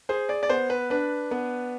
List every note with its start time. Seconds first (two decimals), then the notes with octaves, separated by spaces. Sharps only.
0.09 G#4 C5
0.29 D5
0.43 D5
0.49 B3 C5
0.70 B4
0.90 D4 B4
1.31 B3